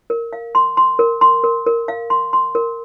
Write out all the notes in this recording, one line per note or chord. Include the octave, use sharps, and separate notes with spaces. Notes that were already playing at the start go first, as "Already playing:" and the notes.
A#4
F5
C6
C6
A#4
C6
A#4
A#4
F5
C6
C6
A#4